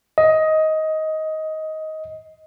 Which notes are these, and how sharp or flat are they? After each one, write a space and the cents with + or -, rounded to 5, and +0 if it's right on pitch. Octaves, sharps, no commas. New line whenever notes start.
D#5 +15